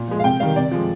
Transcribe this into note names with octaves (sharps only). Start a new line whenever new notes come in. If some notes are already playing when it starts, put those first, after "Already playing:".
Already playing: A#2
F3 G#3
F5
C3 G5
D#3 G3 F5
C3 D5
F3 G#3